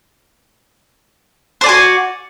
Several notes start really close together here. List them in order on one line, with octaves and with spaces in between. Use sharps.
C5 D5 G#5 F#4